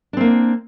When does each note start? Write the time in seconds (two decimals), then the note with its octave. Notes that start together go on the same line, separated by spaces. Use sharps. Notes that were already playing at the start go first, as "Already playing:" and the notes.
0.13 D4
0.17 C4
0.21 A#3